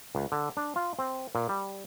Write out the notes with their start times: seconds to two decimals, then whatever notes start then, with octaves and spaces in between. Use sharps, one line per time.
0.15 C#2
0.32 D3
0.57 D4
0.76 F4
0.99 C4
1.35 A#2
1.49 G3